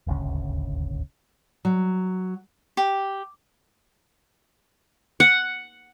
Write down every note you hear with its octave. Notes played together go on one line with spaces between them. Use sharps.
D#1 G#1 D2 C#3
F#3
G4
F#5